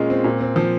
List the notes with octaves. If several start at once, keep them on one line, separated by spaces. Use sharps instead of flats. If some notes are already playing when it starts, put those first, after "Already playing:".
Already playing: A#2 G#3 C#4 F4
C4
A#2
C4
F3